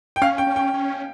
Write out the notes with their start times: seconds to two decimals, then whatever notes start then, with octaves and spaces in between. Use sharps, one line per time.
0.16 G5
0.22 C#4 F5
0.38 G5
0.47 C#4
0.56 G5
0.74 C#4